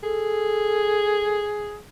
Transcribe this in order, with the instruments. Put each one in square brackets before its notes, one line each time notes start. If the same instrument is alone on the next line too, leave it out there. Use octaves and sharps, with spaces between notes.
[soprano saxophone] G#4 [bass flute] A4